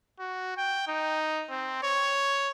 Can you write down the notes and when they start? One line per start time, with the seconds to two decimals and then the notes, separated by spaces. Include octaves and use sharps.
0.19 F#4
0.57 G5
0.88 D#4
1.50 C4
1.82 C#5